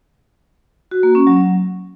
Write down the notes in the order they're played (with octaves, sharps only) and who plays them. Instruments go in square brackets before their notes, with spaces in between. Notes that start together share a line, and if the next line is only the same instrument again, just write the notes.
[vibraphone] F#4
A#3
C#4
F#3